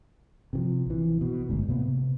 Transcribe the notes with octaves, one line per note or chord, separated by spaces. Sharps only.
C3 D#3 F3
A#1 E3
B2
G1 D2 G#2
A2 C3 A#3 B3
C3